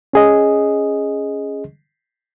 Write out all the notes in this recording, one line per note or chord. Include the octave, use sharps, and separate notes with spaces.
C#4 G#4 D#5